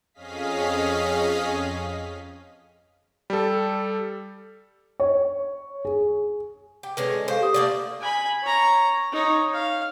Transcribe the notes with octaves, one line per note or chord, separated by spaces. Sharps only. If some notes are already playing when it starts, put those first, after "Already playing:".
F2 C#4 G#4 D#5 F5 B6
G3 A4
C#5
G#4
G4
D3 G#3 C#4 B4
A4 C5 F5
G4 D#6
A3 A#3 D4
G#5 B5
C#5 A#5
D#4 C#5
F5